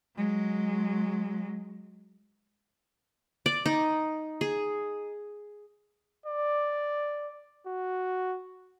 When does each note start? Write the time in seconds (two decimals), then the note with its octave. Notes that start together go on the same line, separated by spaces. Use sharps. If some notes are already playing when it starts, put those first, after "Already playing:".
0.16 F#3 G#3
3.46 D5
3.66 D#4
4.41 G#4
6.26 D5
7.66 F#4